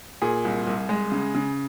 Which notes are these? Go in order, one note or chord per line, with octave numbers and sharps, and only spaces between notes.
A#2 G#4
C2
C2
G#3
C#3
C#3